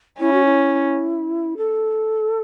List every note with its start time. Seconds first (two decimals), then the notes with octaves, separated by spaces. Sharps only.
0.20 C#4 E4
0.33 F#4
0.45 E4
1.57 A4